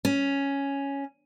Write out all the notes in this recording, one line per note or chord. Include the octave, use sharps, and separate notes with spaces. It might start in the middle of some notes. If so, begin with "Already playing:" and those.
C#4